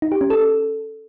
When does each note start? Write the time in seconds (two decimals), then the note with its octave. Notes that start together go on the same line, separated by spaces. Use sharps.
0.02 D#4
0.12 G4
0.21 C#4
0.30 A4